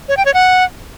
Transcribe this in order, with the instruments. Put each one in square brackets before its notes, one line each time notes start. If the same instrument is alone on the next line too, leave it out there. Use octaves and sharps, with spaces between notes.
[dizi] C#5
G5
C#5
F#5